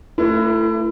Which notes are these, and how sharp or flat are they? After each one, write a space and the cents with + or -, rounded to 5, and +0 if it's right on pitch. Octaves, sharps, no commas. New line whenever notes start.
A3 +15 E4 +35 B4 -30